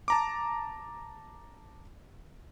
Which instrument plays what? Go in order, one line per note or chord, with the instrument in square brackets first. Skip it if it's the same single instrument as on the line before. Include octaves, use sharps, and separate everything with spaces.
[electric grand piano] A5 A#5 D6